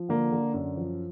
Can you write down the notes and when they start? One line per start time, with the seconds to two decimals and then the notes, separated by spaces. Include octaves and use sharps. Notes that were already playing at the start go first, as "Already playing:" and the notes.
Already playing: F3
0.09 D3 A#3
0.32 D3
0.54 F#2
0.76 F3